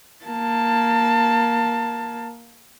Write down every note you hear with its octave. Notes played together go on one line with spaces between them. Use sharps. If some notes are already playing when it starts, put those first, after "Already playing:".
A#3 A5